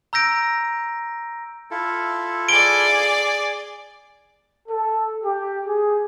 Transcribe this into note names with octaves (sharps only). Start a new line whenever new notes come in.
A#5 E6 G6 A#6 D7
E4 F4 A4
G#4 D5 D7 G7
A4
G4
G#4